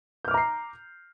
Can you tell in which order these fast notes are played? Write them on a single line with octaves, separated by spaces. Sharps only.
G6 F6 D6 A#5 C7